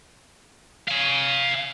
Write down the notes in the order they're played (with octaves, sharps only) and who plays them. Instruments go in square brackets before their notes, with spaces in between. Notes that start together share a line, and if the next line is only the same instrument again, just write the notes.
[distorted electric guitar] F5 G#5